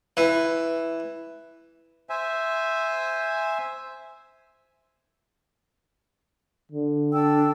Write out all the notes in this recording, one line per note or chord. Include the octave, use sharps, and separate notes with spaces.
E3
C5 E5 G#5
D3
D4 G5 E6